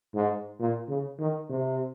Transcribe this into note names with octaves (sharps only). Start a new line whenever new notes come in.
G#2
A#2
C#3
D#3
C3